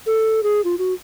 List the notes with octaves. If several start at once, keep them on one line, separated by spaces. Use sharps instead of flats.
A4
G#4
F4
F#4